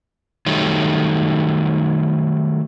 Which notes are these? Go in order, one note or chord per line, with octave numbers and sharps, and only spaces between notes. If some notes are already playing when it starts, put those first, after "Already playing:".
D#3 F#3 G3 A3